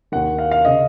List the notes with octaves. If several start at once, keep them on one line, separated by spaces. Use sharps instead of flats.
D#2 D#3 F#5
F5
F5
C#3 D#5